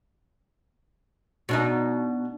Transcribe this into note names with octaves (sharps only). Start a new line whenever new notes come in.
B2 D4 D#4